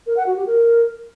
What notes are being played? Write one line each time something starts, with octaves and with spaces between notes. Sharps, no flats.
A#4
F#5
F#4
G4
A#4